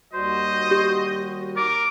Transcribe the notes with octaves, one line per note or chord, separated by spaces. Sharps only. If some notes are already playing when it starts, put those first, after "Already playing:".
D#2 G3 F#4 C5 D#5
G4
A#4 D6